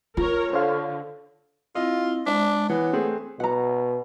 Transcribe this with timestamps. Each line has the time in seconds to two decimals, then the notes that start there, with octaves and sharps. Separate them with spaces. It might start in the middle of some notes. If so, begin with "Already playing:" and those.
0.17 F4 A#4 C#5
0.53 D3 C5 C#5 F5
1.75 C4 E4 F4 D#5
2.26 G#3 D4
2.70 E3 B3 C#5
2.93 A3 C4 G#4
3.40 B2 F#5 A#5